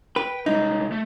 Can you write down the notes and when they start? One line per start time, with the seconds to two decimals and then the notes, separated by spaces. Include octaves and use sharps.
0.16 B4 G5
0.46 C2 G#3 D#4
0.92 A3